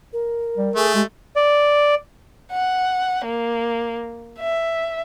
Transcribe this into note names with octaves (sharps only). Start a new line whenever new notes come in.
A#4
G3
A3 G#4
G#3 G4
D5
F#5
A#3
E5